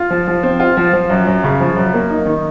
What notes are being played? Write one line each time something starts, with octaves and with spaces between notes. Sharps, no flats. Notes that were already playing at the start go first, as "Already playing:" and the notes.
Already playing: F4
F3
F3
C4
F4
F3
F3
F#2
F#2
C#3
F3
F#2
A#3
D#4
D#3